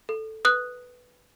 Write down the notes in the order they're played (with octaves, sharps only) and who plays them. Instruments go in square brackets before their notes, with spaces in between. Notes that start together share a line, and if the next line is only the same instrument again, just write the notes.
[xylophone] A4
B4 D#6 F#6